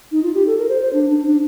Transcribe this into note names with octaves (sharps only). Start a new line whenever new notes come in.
D#4
F4
G4
A4
A#4
C5
C5
D4
D4
D4